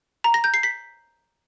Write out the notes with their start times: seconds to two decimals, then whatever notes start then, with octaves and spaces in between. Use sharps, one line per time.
0.24 A#5
0.34 A#6
0.44 G6
0.54 C7
0.63 B6